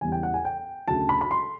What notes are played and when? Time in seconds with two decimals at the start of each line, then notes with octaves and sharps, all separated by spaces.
0.01 E2 C#3 E3 G3 B3 G#5
0.12 G5
0.23 F#5
0.34 G#5
0.45 G5
0.88 D2 C#3 F#3 A5
1.09 B5
1.21 B5
1.31 C6